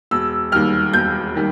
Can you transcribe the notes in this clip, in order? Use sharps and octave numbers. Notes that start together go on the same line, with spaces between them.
E1 E6
D#2 D#3 G3 F6
E1 G6
D#3 G3